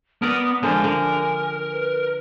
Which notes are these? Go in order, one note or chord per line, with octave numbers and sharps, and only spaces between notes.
B3 A#4 D5 D#6
D3 F3 G#3 A#4 G#5
D3 A#4
B4